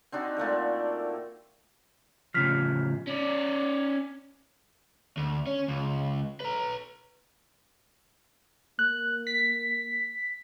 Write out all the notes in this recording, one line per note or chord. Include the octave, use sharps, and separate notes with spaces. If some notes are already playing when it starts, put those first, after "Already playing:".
C4 D4 D#4 F#4
A#2 A3 A#3 A#4
A2 C#3 F3 F6 B6
C#4 D5
D2
C#4
C#2
B4 A#5
A#3 F#6
B6